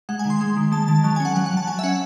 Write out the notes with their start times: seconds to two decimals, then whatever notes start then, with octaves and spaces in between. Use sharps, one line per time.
0.09 G#3 F#5
0.19 G#5
0.25 D#3
0.30 C6
0.41 G#3
0.57 D#3
0.72 G#3 A5
0.88 D#3 A5
1.04 F#3 A5
1.16 G#5
1.20 C#4 F#5
1.35 F#3 F#5
1.46 F#5
1.52 F#3
1.57 A5
1.67 F#3 G#5
1.79 E5
1.83 C#4 F#5